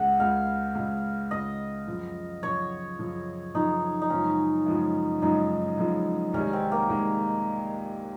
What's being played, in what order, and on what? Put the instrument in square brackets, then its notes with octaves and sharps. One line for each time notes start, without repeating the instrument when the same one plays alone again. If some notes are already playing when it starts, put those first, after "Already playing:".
Already playing: [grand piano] C#2 C#3 G#3 [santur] F#5
[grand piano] C#2 C#3 G#3 [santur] F5
[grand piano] C#2 C#3 G#3
[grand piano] C#2 C#3 G#3 [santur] D#5
[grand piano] F#2 C#3 F3
[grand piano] F#2 C#3 F3 [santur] C#5
[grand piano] F#2 C#3 F3
[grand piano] F#2 C#3 F3 [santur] D#4
[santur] D#4
[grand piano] F#2 C#3 F3 G#3 [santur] C#4
[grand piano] F#2 C#3 F3 G#3
[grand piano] F#2 C#3 F3 G#3 [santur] D#4
[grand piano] F#2 C#3 F3 G#3
[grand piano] C2 C3 D#3 G#3 [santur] C#4
[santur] C4
A#3
[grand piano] C2 C3 D#3 G#3